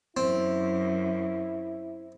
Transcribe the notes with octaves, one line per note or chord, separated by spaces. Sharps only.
F#2 C4 E4